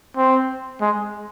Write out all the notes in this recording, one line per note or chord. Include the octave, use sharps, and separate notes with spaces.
C4
G#3